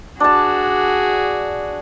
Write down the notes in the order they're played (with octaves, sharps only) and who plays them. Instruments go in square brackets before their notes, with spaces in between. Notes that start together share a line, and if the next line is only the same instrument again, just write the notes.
[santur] D4 A5 [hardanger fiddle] F#4 G#4